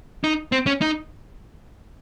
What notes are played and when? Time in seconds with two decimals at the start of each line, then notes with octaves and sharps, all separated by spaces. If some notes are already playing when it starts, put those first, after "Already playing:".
0.24 D#4
0.52 C4
0.67 C#4
0.81 D#4